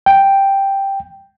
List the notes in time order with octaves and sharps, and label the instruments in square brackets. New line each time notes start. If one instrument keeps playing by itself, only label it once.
[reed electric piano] G5